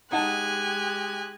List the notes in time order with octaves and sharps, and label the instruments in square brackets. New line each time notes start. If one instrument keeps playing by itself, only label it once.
[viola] G#3 G#5 [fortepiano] D#4 F#5 A5 [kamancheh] G4 F#6